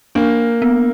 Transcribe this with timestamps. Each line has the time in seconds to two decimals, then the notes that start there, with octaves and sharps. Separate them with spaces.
0.15 A#3 D4
0.62 B3